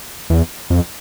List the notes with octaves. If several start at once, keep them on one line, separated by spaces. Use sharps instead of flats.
E2
F2